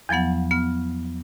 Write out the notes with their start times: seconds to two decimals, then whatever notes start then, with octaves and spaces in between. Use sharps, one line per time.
0.09 E2 F3 F#3 B3 F#5
0.51 B3 F6